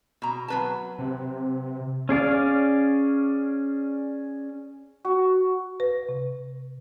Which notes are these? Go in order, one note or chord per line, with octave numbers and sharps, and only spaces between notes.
B2 A#5
F#3 B4 A5
C3
C#4 G#4 D5 F5
F#4
B4
C3